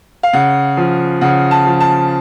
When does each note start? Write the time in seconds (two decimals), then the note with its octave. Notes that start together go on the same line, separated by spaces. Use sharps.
0.23 F5
0.33 C#3 F#5
0.77 F3
1.21 C#3 F#5
1.51 A5
1.66 F3
1.80 A5